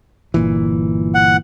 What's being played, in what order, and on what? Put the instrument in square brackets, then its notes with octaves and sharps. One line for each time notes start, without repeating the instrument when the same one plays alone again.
[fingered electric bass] G1 A#2 E3
[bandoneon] F#5